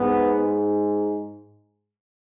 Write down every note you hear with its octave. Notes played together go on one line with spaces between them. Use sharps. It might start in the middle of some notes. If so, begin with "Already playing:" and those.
Already playing: G#2 B3